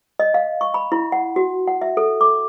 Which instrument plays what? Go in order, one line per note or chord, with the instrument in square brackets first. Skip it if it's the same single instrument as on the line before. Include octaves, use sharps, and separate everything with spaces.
[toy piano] D#5
F5
C#6
B5
E4
F#5
F#4
F#5
E5
A4
D6